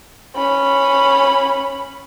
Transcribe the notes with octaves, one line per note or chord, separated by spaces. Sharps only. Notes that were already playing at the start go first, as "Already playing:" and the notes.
C#4 B5